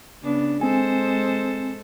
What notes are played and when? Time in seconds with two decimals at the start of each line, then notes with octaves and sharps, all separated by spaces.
0.23 C#3 B3 D4
0.61 G#3 C4 A4 C5 G#5